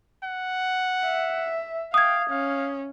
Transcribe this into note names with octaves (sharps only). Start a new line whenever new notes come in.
F#5
E5
F5 G5 D#6 G#6
C#4 F5